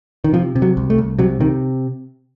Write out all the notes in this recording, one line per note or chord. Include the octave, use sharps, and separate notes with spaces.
D#3
C3 F3
C3
F#3
C2
A3
C2
C3 F#3
C3 D#3